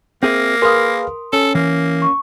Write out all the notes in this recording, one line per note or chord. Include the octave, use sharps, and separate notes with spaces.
A#3 C4 G#4 E5
G#4 A#4 B4 F5 C6 D#6
C#4 A4
E3 A#3
C#6